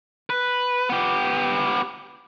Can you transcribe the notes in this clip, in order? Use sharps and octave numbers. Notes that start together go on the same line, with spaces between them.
B4
B3 G4